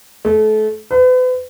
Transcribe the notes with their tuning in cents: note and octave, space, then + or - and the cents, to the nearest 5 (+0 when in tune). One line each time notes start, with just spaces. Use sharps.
A3 -30
B4 +40